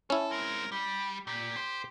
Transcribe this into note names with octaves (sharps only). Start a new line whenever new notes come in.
C#4 E4 A4
G#3 C4 A#4
G3 G4
A#2 G4
C5